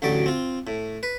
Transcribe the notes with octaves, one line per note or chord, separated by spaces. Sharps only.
A1 D2 F#3 G4 D5
C4 F4
A2
B4